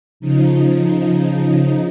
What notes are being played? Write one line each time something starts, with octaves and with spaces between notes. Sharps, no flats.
C#3 F3 D#4